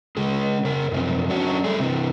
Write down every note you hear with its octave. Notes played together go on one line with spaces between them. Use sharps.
C#3 G#3 G#4
C#3 A#4
F#2 C3 F3
F#3 C#4 D4 F#4
G3 A3 G#4
C3 E3